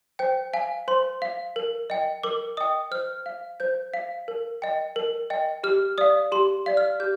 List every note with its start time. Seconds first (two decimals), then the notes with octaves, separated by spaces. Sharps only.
0.19 C5 G5
0.53 F5 G#5
0.88 C5 C6
1.22 F5
1.56 A#4
1.90 D#5 G5
2.23 A#4 D6
2.57 D#5 G5 D#6
2.91 C5 F6
3.26 F5
3.60 C5 G6
3.94 F5
4.28 A#4
4.62 D#5 G5
4.96 A#4
5.30 D#5 G5
5.64 G4 F6
5.98 D5 F5 D#6
6.32 G4 C6
6.66 D5 F5
6.77 F6
7.00 G4 G6